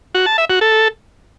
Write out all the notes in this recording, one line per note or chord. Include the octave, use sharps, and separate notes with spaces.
F#4
A5
E5
F#4
A4